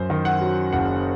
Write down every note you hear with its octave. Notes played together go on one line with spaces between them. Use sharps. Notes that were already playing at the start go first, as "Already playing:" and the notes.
Already playing: F#2 C5
D#3
F#5
F#3
F#1 F#5